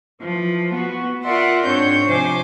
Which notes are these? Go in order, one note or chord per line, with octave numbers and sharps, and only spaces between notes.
E3 F3
B3 F#4
F4 A#4 D5 E5 F#5 C6
G#2 C4 D4 C#5 G6
C3 F3 C5 G#5 D6